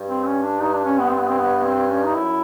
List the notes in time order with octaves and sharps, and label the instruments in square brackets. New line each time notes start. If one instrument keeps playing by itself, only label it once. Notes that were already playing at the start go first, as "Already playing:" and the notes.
Already playing: [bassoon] G2
[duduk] C4
C#4
D4
[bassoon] G2 [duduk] D#4
[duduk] D4
C#4
B3
C4
B3
C4
B3
C4
C#4
D#4
[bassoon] F#2 [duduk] E4